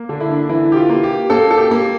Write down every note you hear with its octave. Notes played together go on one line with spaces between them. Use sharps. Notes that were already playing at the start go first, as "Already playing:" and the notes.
Already playing: A#3
D3 D4
E4
D4
E3 E4
G4
F4
A#3
G4
A#3 A4
A4
G4
A#3